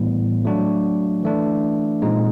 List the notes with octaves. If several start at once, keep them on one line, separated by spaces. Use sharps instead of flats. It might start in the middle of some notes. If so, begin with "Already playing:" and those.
Already playing: A2 E3 G3 B3
F#3 A3 D4 F#4
E3 A3 D4
A#2 F3 G#3 C4 D#4